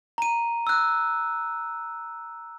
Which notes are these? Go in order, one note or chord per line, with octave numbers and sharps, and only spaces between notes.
A#5 D#7
E6 F#6